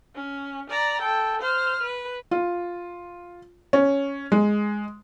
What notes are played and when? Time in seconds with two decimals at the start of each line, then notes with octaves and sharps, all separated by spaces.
0.15 C#4
0.70 D5 A#5
1.01 A4 G5
1.42 C5 F6
1.83 B4
2.31 F4
3.73 C#4
4.32 G#3